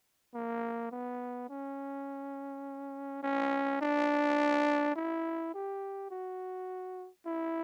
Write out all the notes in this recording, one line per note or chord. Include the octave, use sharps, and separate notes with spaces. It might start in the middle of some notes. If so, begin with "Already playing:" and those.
A#3
B3
C#4
C#4
D4
E4
G4
F#4
E4